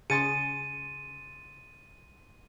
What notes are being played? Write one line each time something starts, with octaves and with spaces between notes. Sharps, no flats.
C#3 G#4 C6 A6 C#7 D#7